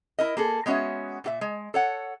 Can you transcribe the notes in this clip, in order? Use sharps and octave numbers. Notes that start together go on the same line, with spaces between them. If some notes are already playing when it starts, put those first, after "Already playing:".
E4 A#4 D#5
A#3 G#4 A4
G#3 B3 C#4 F#4 C#5 E5
A#2 F#4 E5
G#3
A4 C#5 F#5